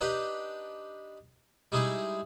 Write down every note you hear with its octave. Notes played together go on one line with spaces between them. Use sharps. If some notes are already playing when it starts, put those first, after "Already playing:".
D4 D#4 G4 B4
G3 G#3 D#4 E4 G#4